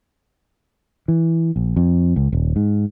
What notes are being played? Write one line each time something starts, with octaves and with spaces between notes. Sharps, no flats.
E3
A#1
F2
C#2
D#1
G#2